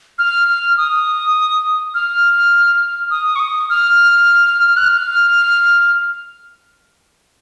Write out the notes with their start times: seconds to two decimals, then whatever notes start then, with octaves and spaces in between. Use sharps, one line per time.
0.19 F6
0.78 D#6
1.94 F6
3.11 D#6
3.36 C#6
3.40 D#6
3.70 F6
4.77 F#6
4.85 F6